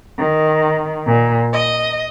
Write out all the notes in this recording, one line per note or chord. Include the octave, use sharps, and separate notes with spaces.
D#3
A#2
D#5